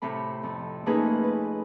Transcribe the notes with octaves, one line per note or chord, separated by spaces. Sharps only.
A2 C3 A3 B5
F2
A3 A#3 C#4 D#4 G#4 B4
B4